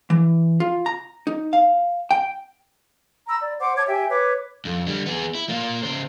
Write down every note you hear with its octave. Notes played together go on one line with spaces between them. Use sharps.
E3
F4
A#5
D#4
F5
G5
A#5 B5 E6
D5
C5 F#5 D6
C#5 A5 D6 G#6
G4 E5 G5 G#5
B4 C#5 D6
F2
D3 G3
B3 G#4
E4
A#3 F4
C#3 C5